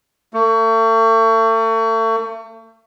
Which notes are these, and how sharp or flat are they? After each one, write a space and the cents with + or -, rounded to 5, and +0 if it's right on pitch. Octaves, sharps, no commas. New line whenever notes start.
A3 +40